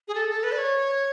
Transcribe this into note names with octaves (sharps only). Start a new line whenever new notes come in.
G#4
A4
A4
B4
D5
C#5